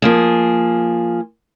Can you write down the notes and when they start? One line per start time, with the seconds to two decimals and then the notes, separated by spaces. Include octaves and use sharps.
0.02 F3 A#3 G#4